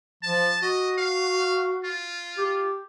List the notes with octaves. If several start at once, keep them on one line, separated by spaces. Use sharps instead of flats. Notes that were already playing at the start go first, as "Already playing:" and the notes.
F3 A5
F#4 D#5
F5
F4
G4